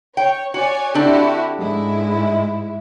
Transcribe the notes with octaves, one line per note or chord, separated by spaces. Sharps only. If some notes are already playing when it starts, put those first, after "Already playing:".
C#5 G5
F#4 C#5 D5 G#5
D3 C4 D4 E4 F#4 G4
G#2 G#3 E4